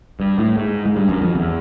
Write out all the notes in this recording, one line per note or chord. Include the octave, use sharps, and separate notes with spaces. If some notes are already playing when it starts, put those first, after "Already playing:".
G2
A2
G#2
G#2
G2
F#2
F2
E2